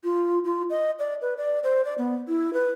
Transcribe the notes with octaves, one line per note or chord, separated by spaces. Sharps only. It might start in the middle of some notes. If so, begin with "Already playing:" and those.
F4
F4
D#5
D5
B4
D5
C5
D5
B3
E4
B4